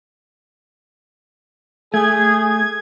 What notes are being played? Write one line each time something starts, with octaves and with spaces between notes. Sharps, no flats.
A3 G#4 G#6